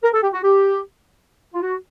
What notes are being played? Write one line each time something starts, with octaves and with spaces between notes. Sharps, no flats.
A#4
A4
G4
F#4
G4
F4
F#4